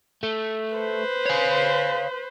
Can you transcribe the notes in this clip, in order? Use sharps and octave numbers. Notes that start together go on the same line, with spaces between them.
A3
B4 C5
C#5 F5